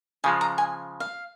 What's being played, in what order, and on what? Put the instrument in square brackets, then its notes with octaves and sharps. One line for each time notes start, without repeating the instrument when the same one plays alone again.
[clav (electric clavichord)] C#3 F3 G#3 [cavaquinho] G#5
[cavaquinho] A#5
G#5
F5